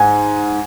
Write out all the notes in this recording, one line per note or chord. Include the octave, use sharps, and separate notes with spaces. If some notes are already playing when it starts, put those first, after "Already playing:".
Already playing: G#2 G#5